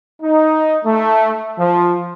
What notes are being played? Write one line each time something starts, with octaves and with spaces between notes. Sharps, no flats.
D#4
A3
F3